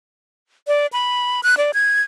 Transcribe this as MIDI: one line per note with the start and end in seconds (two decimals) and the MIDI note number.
0.68 0.87 74
0.93 1.41 83
1.43 1.55 90
1.58 1.71 74
1.74 2.02 92